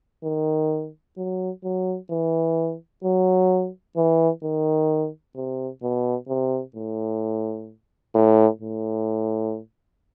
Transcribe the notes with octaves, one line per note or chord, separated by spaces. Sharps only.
D#3
F#3
F#3
E3
F#3
E3
D#3
C3
B2
C3
A2
A2
A2